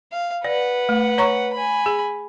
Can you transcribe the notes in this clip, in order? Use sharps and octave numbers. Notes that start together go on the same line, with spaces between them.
F5
B4 D5 F#5
A3
C#5 A#5 C#6
G#5 B5
G#4